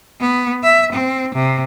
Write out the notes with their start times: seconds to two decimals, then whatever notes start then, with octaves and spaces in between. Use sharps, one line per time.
0.20 B3
0.63 E5
0.92 C4
1.35 C3